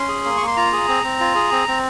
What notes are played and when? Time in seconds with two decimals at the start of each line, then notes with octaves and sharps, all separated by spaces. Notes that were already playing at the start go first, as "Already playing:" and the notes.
Already playing: C#4 C6
0.08 G#4
0.25 A#3
0.37 A#3 C#6
0.47 C6
0.56 F4 A#5
0.73 G#4
0.88 C4
1.04 C4
1.20 F4
1.35 G#4
1.52 C4
1.68 C4